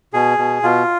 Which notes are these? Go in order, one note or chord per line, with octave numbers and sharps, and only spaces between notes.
B2 G#4
B2
B2 F4